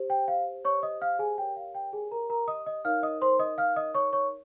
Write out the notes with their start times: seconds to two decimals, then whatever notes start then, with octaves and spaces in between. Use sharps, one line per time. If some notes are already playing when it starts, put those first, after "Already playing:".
Already playing: G4 C5
0.10 G5
0.28 F5
0.65 C#5 C#6
0.83 D#5 D#6
1.01 F5 F6
1.19 G#4 G#5
1.38 G4 A#4 C#5 G5
1.56 F5
1.75 G5
1.93 G#4 G#5
2.11 A#4 A#5
2.30 A#4 A#5
2.48 D#5 D#6
2.66 D#5 D#6
2.85 D#4 A#4 C#5 F5 F6
3.03 D#5 D#6
3.21 C5 C6
3.39 D#5 D#6
3.58 F5 F6
3.76 D#5 D#6
3.95 C#5 C#6
4.13 C#5 C#6